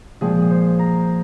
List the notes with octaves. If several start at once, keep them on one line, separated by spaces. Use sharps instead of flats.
A#2 F3 G#3 G#4
C5
A#5